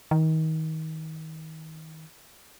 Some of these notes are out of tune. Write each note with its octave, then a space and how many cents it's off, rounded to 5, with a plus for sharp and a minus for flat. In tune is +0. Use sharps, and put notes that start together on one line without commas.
D#3 +30